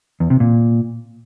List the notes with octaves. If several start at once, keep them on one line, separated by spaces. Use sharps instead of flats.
E2
C3
A#2